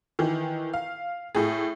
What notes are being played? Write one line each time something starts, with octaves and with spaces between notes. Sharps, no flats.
D#3 E3
F5
A2 G#4